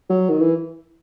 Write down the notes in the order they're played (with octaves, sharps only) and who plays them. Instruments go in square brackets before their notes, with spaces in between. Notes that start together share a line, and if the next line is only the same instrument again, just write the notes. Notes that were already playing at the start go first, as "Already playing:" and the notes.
[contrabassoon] F#3
D#3
E3